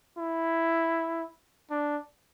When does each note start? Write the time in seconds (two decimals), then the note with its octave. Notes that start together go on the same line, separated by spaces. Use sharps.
0.18 E4
1.71 D4